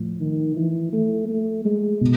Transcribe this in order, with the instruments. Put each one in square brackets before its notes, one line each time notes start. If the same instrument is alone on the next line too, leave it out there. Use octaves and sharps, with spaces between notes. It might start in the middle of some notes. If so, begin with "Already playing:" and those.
Already playing: [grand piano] A2 F3
[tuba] D#3
E3
A3
A3
G#3
[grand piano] B2